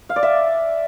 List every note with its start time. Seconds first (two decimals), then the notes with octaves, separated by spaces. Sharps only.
0.09 F5
0.16 D5
0.23 E5